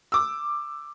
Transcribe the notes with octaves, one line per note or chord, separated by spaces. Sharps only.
D6 E6